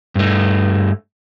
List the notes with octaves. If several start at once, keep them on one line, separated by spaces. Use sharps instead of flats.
G2 A3